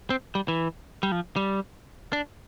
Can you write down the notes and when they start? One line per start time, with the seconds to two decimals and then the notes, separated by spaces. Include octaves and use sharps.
0.10 C4
0.35 G3
0.48 E3
1.03 G3
1.12 F3
1.36 G3
2.13 D4